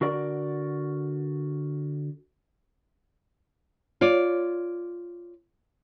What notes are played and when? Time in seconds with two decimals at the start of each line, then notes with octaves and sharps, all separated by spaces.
0.01 D3 F#4 A#4 D5
4.01 F4 C#5 D5